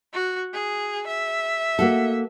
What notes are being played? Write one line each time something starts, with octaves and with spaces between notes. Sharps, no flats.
F#4
G#4
E5
A#3 F#4 A4